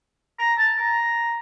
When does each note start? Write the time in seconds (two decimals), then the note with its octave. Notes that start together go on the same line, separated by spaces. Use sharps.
0.39 A#5
0.58 A5
0.78 A#5